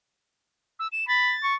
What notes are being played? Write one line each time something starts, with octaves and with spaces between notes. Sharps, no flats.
E6
E7
B5 A6
C#6